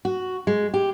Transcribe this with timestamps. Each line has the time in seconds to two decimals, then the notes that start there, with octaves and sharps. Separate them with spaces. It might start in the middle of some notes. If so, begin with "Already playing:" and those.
0.05 F#4
0.47 G#3
0.74 G4